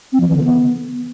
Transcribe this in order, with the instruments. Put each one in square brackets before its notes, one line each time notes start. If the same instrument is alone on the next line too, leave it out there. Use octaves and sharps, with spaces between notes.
[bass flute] C4
F3
E3
D3
B3